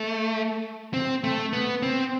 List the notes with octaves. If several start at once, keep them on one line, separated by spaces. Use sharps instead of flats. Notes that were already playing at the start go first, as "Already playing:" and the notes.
Already playing: A3
C4
A3
B3
C4